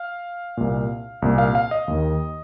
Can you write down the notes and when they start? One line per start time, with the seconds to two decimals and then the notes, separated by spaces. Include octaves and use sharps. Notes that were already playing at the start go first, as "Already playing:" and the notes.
Already playing: F5
0.57 C2 A#2
1.22 C2 A#2
1.38 F5
1.55 F5
1.71 D#5
1.88 D#2 D#3